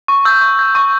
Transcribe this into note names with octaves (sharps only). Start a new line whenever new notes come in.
C#6
E6 G6
C#6
G6
C#6